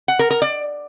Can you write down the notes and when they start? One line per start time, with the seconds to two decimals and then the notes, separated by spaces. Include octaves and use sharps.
0.08 F#5
0.19 A#4
0.30 A#4
0.42 D5